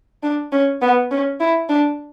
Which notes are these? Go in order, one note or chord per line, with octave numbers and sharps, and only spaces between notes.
D4
C#4
B3
C#4
E4
D4